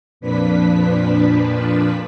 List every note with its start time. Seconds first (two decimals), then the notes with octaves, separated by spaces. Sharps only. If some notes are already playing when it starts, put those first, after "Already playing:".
0.21 F2 A#2 F3 D4 B4 B6